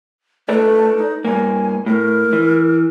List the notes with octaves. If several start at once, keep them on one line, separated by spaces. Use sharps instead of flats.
A3 A4 B4 D5
D#4
G2 A#3 G#5
A2 A#4
E3